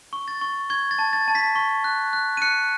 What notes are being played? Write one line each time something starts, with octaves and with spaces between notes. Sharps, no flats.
C#6
A6
C#6
C#6 G#6
A6
A5
A6
A5
B6
C#6
F#6
F#6
D#7
F#6 C#7